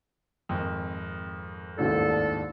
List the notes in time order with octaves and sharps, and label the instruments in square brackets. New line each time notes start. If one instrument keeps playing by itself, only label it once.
[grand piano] G#1 F2
[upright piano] A1 D#2 G#2 [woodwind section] D4 A4